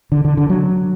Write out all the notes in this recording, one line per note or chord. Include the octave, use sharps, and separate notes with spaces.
D3
D3
D3
F#3